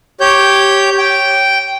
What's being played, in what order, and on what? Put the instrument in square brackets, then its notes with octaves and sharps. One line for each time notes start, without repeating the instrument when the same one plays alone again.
[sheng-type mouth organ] G4 C#5 G6
G5